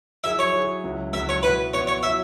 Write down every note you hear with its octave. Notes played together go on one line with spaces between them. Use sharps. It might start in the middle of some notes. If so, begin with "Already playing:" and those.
F#3 E4 G#4 E5
C#5
F#3 E4 G#4
C#2 C#3 F#3 E4
C#2 C#3 F#3 E4 E5
C#5
B2 B3 E4 B4
B2 B3 E4 C#5
C#5
F#3 E4 C#5 E5